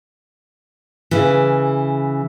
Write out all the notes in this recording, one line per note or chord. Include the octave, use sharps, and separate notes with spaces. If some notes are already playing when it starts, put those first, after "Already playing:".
C#3 E3